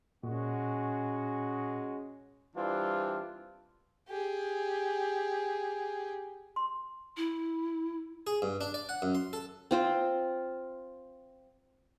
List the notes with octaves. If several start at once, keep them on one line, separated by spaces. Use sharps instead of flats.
A#2 G#3 C#4 F#4
E3 G3 C4 D4 F4
G4 G#4
C6
E4
G#4
G2
D4
D5
F#5
F#2
C6
A4
C4 F4 C5